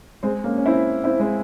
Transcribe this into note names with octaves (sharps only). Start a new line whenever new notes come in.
G#3 C4
A#3 C#4
C#4
C4 E4
C4 E4
G#3 C4